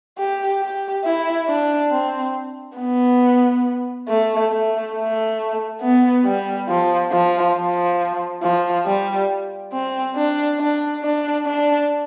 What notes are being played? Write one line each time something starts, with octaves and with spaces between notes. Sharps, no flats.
G4
G4
E4
D4
C4
B3
A3
A3
A3
B3
G3
F3
F3
F3
F3
G3
C4
D4
D4
D4
D4